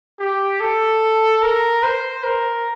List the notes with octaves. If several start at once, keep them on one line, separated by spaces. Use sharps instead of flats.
G4
A4
A#4
C5
A#4